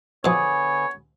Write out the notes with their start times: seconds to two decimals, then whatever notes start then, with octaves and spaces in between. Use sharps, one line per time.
0.25 B2 D3 F3 B3 G#4 C#5